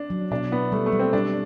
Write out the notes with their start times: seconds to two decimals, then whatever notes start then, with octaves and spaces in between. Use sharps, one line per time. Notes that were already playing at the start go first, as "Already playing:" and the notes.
Already playing: D4
0.10 F#3
0.31 B2 D4
0.51 B3 E4
0.72 G3 A3
0.86 A3
0.92 G3
0.99 C4
1.13 G3 D4